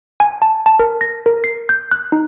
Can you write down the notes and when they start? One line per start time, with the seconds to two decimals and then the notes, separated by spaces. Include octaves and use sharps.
0.20 G#5
0.42 A5
0.66 A5
0.79 A#4
1.01 A#6
1.26 A#4
1.44 C7
1.69 G6
1.91 F#6
2.12 D#4